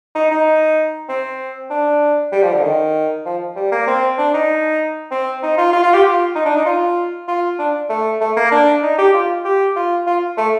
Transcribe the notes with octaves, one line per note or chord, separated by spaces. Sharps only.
D#4
D#4
C4
D4
G3
F3
D3
D#3
F3
G3
A#3
C4
D4
D#4
C4
D#4
F4
F4
F4
G4
F4
D#4
D4
D#4
F4
F4
D4
A3
A3
A#3
D4
D#4
G4
F4
G4
F4
F4
A3